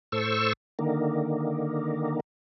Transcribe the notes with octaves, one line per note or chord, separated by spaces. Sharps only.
A2 A4 C5 C#6 E6
D3 D#3 A#3